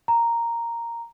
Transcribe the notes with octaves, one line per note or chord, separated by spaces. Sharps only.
A#5